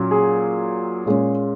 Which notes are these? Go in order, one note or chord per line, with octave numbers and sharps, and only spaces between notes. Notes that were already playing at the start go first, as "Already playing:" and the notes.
Already playing: A#2 F#3 C#4
G#4
A#2 G#3 C#4